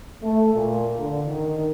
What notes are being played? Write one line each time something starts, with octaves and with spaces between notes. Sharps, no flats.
A3
A#2
D3
D#3